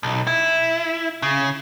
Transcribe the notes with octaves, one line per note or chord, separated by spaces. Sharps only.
B1
E4
C#3